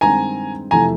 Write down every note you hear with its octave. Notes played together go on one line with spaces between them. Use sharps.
G2 D#3 G#3 C4 G#5 A#5
F2 C3 E3 A3 G#5 A#5